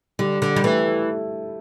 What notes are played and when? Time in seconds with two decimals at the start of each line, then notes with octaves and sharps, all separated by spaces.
0.19 D3 G3
0.42 D3
0.56 G3
0.64 E3 A3